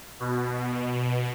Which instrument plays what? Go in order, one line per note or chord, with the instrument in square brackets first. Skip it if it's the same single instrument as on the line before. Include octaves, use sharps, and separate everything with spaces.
[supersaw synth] B2